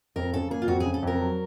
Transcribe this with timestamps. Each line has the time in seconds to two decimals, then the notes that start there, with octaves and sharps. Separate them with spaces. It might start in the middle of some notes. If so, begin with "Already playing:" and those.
0.16 F2 A#4
0.33 C#3 A4
0.51 A#3 G#4
0.62 F4
0.67 F2 F#4
0.80 G#4
0.86 C#3
0.94 A4
1.02 F2 A#4
1.20 F#3